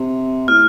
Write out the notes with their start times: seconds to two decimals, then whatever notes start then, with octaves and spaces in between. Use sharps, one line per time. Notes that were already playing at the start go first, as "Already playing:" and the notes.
Already playing: C3
0.48 A2 F6